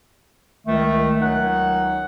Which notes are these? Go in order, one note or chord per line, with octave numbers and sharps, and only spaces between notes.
C#2 D#3 A3
C#2 D#3 F#3 C#4 D#4 F#5